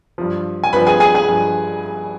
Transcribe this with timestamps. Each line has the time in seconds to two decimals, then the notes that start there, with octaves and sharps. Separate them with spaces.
0.18 G2 F3
0.64 G#5
0.73 G2 F3 B4 B5
0.87 G#4 G#5
1.00 G#4 G#5
1.15 G#4 G#5
1.29 G2 F3